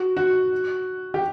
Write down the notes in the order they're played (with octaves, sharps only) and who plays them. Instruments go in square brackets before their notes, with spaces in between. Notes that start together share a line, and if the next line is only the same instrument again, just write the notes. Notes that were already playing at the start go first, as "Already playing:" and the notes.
Already playing: [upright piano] F#4
F#4
G4